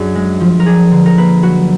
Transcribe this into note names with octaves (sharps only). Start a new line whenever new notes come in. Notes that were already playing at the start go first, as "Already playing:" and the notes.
Already playing: F#2 D4 F#4 G#4
G#3
F3
A#4
D4 G#4
D3
A#4
A#3 B4
F#3 F#4